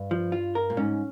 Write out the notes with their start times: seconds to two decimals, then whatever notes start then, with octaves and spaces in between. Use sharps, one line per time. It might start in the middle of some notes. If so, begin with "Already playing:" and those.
Already playing: G2
0.11 F3
0.32 F4
0.55 A#4
0.70 A#2
0.77 G#2 C#4